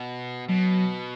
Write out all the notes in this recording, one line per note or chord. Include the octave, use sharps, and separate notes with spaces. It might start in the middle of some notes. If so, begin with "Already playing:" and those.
Already playing: B2
B2 F#3